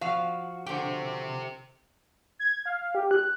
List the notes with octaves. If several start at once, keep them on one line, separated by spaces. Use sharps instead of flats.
F3 F#4 F5
D3 G4 C5 G5
G#6
F5
G4
F#6